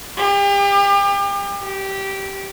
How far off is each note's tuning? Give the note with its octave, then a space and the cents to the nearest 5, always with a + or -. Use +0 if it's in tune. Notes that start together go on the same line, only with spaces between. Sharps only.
G4 +35
G4 -10